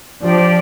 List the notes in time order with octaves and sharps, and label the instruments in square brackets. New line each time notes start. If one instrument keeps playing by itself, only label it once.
[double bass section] F3 [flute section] D4 G4 D5